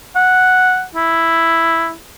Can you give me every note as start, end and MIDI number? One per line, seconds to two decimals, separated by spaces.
0.15 0.84 78
0.94 1.93 64